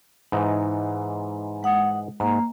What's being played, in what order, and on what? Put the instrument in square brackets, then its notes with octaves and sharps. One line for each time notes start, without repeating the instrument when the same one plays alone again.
[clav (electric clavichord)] G#2 E3 D#4
[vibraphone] G#3 F#5 D#6
[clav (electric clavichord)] G#2 [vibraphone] A#3 A#5